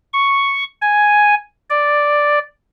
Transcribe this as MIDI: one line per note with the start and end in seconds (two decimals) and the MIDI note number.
0.13 0.64 85
0.82 1.35 80
1.70 2.39 74